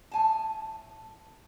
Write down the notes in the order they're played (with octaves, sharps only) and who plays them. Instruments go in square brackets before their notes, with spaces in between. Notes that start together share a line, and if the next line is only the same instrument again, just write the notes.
[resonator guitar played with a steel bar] A2 G#5 A5